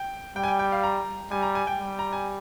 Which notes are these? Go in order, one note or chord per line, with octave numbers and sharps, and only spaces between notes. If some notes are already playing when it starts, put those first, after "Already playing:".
Already playing: G5
G3 G5
G#5
G5
G5
F5
A#5
G3 G#5
A#5
G#5
G5
G3
A#5
G#5